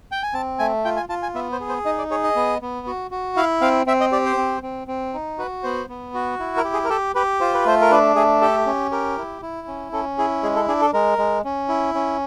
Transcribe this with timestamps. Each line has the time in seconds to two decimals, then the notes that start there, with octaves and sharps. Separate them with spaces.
0.12 G5
0.23 G#5
0.33 C4 A5
0.59 A3 G#5
0.85 F4 G5
0.97 G#5
1.09 F4 A5
1.22 G#5
1.35 B3 E5
1.52 C5
1.60 G#4
1.69 C5
1.85 D#4 D#5
1.98 D5
2.11 G#4 C#5
2.23 D#5
2.36 B3
2.62 B3
2.87 F#4
3.11 F#4
3.36 E4 F5
3.61 C4 F5
3.87 C4 E5
4.00 D#5
4.12 G4 D5
4.25 C5
4.37 C4
4.63 C4
4.88 C4
5.14 D#4
5.38 F#4 B4
5.63 B3 C5
5.89 B3
6.14 F#4
6.39 E4
6.57 A#4
6.64 G4
6.73 G#4
6.84 A#4
6.89 G4 A4
7.15 G4 B4
7.40 F4 C5
7.54 B4
7.66 A3 C5
7.81 A#4
7.91 D4 B4
8.16 A3 G#4
8.41 G4 A4
8.66 C#4
8.91 G4 A#4
9.18 E4
9.42 E4
9.67 C#4
9.92 C#4 A4
10.18 E4 G#4
10.43 G#3 G#4
10.56 A4
10.68 D4 G#4
10.81 A4
10.93 G#3 A#4
11.18 G#3
11.45 C#4
11.69 E4
11.94 C#4